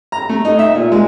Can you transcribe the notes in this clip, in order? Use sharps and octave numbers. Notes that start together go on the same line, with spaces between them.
A#5
A3
D#4
E5
A#2
G#3